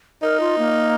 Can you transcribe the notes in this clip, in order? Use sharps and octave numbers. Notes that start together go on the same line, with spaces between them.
D#4 A#4
F4
A#3